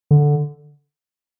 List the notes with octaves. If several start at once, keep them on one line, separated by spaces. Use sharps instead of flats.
D3